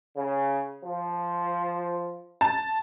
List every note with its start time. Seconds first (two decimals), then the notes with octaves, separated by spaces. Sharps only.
0.16 C#3
0.84 F3
2.41 A5